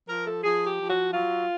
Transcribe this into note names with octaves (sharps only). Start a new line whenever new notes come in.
F3 A#4
A4
F3 G#4
G4
F3
F#4
F#3 F4